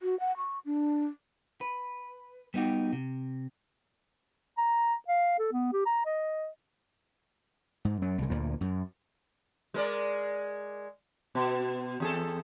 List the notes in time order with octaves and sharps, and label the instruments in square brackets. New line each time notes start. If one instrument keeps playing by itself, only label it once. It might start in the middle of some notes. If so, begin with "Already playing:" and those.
[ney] F#4
F#5
C#6
D4
[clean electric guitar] B4
G3 B3 D#4 F#4 G4
C3
[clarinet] A#5
F5
A4
B3
G4
A#5
D#5
[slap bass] G#2
F#2 F#3
C2 C#3
D2 A#2
F#2
[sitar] G#3 A#4 D5
B2
E2 G#4 A4